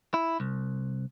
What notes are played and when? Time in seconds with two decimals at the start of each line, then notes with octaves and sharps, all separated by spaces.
0.14 E4
0.40 C2